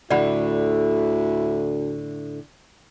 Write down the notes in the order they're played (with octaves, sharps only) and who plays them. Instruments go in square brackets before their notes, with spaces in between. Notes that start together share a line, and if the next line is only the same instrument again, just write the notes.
[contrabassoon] D2 [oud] A2 D3 [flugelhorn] E4 [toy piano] D5 F#5 B5